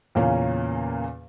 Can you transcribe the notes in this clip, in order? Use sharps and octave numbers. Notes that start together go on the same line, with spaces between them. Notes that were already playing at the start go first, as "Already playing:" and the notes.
E2 A#2 C#3 A#3 C#4